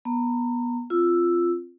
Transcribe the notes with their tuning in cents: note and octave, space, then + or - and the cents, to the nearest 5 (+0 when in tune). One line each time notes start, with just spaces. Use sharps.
B3 -25 A#5 -35
C4 +10 F4 -5 E6 +0